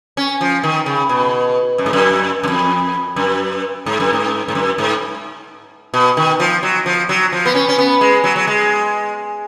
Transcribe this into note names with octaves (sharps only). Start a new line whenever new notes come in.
C#4
F3
D#3
C#3
B2
F#2
G#2
F#2
F#2
F2
F#2
G#2
F#2
G#2
G#2
F#2
G#2
B2
D#3
F3
F#3
F3
F#3
F3
B3
C#4
C#4
B3
G#3
F#3
F#3
G#3